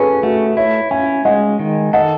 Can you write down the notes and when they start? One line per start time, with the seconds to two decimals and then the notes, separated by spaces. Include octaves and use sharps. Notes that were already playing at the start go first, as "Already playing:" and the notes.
Already playing: C#4 G#4 A4 B4 C#5
0.23 A3 F#4
0.57 E4 C#5 E5
0.91 C#4 E5 G#5
1.25 G#3 D#5 F#5
1.59 D#3
1.93 A4 D#5 F#5